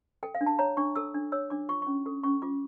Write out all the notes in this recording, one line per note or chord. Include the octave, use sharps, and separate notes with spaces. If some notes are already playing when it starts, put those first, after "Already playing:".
A4 G5
F5
D4
A5
C#5 A#5
D4 C#6
A4 E6
D4
C#5 E6
D4 D6
F4 C#6
C#4 C#6
A4 C#6
C#4 C#6
F4 D6